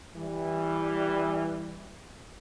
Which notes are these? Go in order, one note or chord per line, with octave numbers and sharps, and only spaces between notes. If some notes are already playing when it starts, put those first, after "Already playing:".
E3 G3